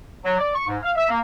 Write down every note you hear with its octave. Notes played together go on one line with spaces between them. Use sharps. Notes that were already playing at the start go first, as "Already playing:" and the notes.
F#3
D5
C#6
G#2
F5
E5
A#3